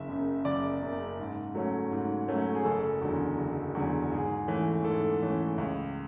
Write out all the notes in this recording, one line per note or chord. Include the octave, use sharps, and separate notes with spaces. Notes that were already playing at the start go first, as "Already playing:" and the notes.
Already playing: F#1 E5
F#2 C#3
F#1 D5
F#2 C#3
G#2
F#3 A3 C#4
G#2
F#3 A3 C#4
G#4
F#1 A4
E2 D3 F#3
F#1
E2 D3 F#3
G#2 G#4
E3 A3 C#4
G#2 A4
E3 A3 C#4
C#2